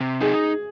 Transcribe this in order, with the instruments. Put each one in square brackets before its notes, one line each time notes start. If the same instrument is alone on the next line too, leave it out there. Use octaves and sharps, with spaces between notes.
[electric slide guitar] C3
[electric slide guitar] D#4 [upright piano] G#4